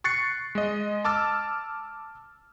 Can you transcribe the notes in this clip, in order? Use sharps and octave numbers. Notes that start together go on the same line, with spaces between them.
C#6 F#6 A6 C7 C#7
G#3 D#5
A5 D6 E6 F6 A6